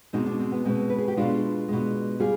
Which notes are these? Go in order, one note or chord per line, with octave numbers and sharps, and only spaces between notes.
B2 G#3 C4 D#4
B3 D4
C4
B3
B2 G#3 C4
B4
G#4
G4
B2 G#3 D4 F4
B2 G#3
G3 F4 G#4